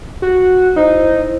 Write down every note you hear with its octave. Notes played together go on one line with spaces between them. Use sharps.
F#4
D#4 E4 C5